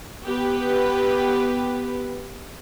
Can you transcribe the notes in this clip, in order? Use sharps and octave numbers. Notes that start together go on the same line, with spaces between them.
B3 G4 B4